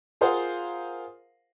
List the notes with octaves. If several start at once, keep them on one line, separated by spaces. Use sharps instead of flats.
F4 G#4 A#4 C5 F5 F#5